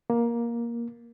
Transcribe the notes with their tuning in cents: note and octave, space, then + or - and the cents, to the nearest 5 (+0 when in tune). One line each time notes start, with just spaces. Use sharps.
A#3 +10